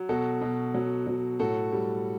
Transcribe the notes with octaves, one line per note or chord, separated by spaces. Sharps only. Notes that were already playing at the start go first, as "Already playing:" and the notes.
Already playing: F#3
B2 F#4 A4
B2
F#3
F#3
A2 F#4 A4
G3